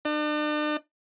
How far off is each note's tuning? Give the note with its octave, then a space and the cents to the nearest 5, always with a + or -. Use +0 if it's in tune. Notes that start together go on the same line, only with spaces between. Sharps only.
D4 +40